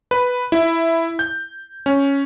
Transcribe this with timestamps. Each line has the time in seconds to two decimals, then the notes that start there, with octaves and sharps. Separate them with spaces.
0.11 B4
0.52 E4
1.19 G6
1.86 C#4